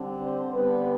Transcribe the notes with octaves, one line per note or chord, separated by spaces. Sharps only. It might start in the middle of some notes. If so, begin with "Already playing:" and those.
Already playing: D3 G3 C4
C5
D3 G3 B3 B4